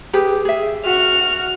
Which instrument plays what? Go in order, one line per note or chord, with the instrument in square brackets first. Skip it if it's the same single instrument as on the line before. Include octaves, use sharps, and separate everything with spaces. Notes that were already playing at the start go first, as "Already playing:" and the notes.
[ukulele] G4 G#4 B4
G#4 E5
[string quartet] F#4 F6